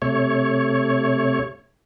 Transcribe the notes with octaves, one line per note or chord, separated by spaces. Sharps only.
C3 A3 C#5